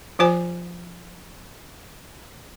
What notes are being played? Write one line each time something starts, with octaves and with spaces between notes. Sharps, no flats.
F3 F4 C5 G#5